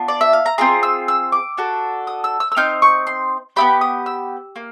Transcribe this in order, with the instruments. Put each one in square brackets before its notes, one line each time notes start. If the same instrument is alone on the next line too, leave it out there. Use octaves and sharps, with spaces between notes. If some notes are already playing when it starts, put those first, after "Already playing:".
Already playing: [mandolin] B3 D4 F4
D5
E5
F5
A#5
C4 F4 G#4 A#5
E6
E6
D6
D4 F#4 A4
D#6
E6
E6
E6
C4 D#4 F6
C#6
C6
B3 E4 G4 B5
D#6
E6
A#3